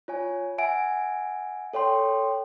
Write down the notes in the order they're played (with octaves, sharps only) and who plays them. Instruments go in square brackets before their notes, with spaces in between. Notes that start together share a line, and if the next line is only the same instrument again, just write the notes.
[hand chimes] F4 C#5 G#5
E5 F#5 G#5 D7
A4 C#5 G5 C6